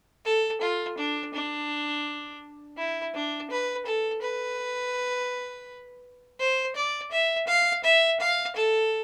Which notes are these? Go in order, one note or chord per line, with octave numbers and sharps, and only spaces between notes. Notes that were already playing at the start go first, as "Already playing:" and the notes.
A4
F4
D4
D4
E4
D4
B4
A4
B4
C5
D5
E5
F5
E5
F5
A4